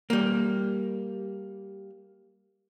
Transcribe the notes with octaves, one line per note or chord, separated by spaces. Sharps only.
G3 A#3